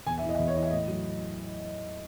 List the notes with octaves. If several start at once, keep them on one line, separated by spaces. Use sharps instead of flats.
E2 G#5
E5
E3
D#5
E5
E2 D#5
C#5
E3 D#5
E5
A2 D#5
F#3